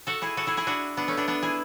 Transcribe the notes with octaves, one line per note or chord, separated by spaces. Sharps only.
F#4 A4
E4 G#4
F#4 A4
E4 G#4
E4 G#4
D4 F#4
B3 D4
A3 C#4
B3 D4
B3 D4
E4 G#4